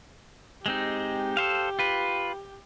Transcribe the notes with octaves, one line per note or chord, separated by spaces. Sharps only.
G#3 C4 D#4 G4
A4 C5 F5
F4 B4